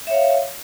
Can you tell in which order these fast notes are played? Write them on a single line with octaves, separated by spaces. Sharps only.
E5 C#5 F5